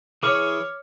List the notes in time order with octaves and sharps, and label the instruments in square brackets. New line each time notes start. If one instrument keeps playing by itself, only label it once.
[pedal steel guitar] E3 G#4 C#6 [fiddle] C#5 [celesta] D6 F6